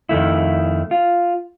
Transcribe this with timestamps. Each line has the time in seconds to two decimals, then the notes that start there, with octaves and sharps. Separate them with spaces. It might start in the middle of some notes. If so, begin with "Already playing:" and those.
0.09 F2 D#3 A3 E4
0.91 F4